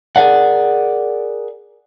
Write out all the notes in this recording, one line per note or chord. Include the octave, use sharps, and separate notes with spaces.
G#4 A#4 D5 F#5